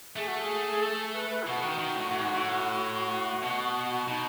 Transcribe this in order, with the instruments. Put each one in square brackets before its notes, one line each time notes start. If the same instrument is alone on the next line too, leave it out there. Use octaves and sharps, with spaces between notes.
[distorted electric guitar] A3 [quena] G#4
[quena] F#4
G#4
A4
A4
B4
B4
E4
[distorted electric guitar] B2 [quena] F#4
[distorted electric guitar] D#3
D#3
A2
A2
G#2
A2
B2
[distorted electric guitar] B2 [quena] D#4